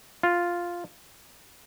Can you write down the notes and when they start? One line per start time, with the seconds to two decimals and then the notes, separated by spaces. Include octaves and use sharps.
0.23 F4